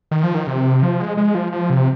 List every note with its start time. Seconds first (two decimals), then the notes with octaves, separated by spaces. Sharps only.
0.11 D#3
0.23 F3
0.35 D#3
0.47 C3
0.83 F3
1.00 G#3
1.17 G#3
1.35 F3
1.52 F3
1.70 C3